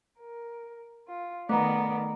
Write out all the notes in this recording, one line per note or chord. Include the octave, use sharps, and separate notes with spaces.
A#4
F4
D#3 A3 B3 D5 A#5